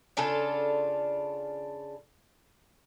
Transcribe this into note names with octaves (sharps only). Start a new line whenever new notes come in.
C#3 D4 F4 A4